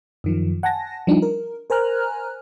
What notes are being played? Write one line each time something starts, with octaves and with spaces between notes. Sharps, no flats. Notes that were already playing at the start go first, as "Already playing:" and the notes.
F#2 D#3 F3
F#5 G#5 A5 A#6
F3 G3 D4 D#4
A#4
A#4 C5 G#5 A#5 F6 F#6